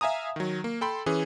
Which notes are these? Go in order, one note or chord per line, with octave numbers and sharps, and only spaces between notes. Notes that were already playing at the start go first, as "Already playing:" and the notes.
E5 F5 G#5 A#5 D#6
D#3 F#3
A#3
A4 G5 B5 C6
E3 C#4 G#4